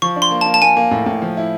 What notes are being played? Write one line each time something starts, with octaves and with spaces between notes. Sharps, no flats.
F3 C#6
D4
C6
A#3
A5
A#3
A5
A#3 G#5
A#3
A2
A2
F3
E4